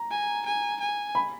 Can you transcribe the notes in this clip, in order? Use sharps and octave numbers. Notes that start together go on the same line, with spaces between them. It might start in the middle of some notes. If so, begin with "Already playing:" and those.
Already playing: A#5
G#5
G#5
G#5
B5